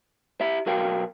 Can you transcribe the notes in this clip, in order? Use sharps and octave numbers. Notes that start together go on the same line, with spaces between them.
E4 G4 E5
B1 F#4 A#4 F5 G5